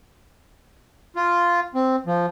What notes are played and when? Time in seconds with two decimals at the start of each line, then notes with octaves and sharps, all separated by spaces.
1.16 F4
1.75 C4
2.06 F3